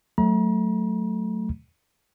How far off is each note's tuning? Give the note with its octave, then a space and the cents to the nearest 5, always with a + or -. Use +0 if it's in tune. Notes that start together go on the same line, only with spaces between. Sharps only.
F#3 +0 A3 +0 A#5 +40